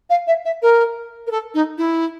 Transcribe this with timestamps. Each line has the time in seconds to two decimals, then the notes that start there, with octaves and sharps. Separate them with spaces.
0.10 F5
0.27 E5
0.45 E5
0.62 A#4
1.27 A#4
1.31 A4
1.54 D#4
1.78 E4